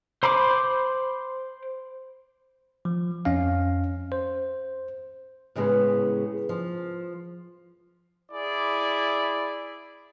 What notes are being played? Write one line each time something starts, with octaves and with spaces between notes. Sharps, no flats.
C5 B5 C6 D6
F3
F2 C#4 F5
C5
A2 C#3 G#3 B3
F3
E4 G#4 D5